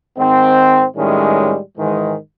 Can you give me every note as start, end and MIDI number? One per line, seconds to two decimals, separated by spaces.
0.17 0.84 44
0.17 0.84 51
0.17 0.84 60
0.97 1.58 45
0.97 1.58 51
0.97 1.58 55
0.97 1.58 56
0.97 1.58 61
1.78 2.15 44
1.78 2.15 51
1.78 2.15 52
1.78 2.15 56